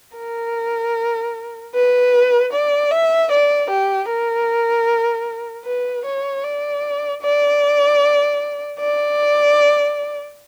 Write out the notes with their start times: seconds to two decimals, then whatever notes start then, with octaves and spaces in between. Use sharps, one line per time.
0.17 A#4
1.75 B4
2.53 D5
2.91 E5
3.31 D5
3.70 G4
4.09 A#4
5.66 B4
6.05 C#5
6.43 D5
7.22 D5
8.79 D5